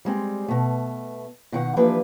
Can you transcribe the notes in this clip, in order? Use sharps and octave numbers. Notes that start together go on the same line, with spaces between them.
G3 G#3 C4
B2 A3
B2 D#3 F#5
E3 F3 A#3 D4 G4 B4